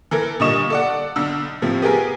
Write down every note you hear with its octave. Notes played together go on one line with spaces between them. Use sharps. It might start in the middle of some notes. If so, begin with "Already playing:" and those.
E3 A4 A#4
A#2 D3 G3 D#5 C#6 E7
A4 D5 F#5
B1 D3 E6
A2 C3 F3
B3 G4 G#4 A#4